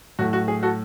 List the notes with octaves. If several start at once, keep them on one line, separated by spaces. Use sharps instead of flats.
A2 F#3 A3 F#4
F#4
G#4
F#4 A4